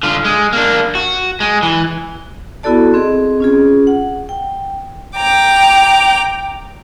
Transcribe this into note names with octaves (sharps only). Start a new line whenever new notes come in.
D3 F4
G#3
A#3 D4
F#4
G#3
E3
B3 E4 F#4 A4 D5 A5
C4 G#4 D#5
C#4 F4 G#4
F#5
G5
G5 A#5 D6